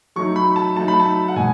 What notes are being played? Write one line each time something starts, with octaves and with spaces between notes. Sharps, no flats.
F#3 A3 D#4 C#6
B5
A5
F#3 A3 D#4 A5
B5
A5
F#5
B2 G#3 G#5